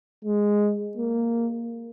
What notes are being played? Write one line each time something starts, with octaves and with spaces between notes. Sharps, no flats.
G#3
A#3